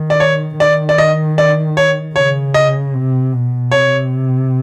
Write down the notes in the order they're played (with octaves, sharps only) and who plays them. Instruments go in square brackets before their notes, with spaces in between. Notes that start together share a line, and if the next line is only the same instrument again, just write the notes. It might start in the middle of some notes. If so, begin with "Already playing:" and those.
Already playing: [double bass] D#3
[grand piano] D5
C#5
[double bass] D#3 [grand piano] D5
[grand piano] D5
D#5
D5
C#5
[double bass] C#3 [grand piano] C#5
[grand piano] D#5
[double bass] C3
B2
[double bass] C3 [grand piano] C#5